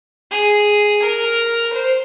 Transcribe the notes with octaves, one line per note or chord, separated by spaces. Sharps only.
G#4
A#4
C5